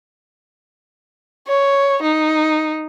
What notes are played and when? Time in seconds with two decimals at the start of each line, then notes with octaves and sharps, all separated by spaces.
1.47 C#5
2.02 D#4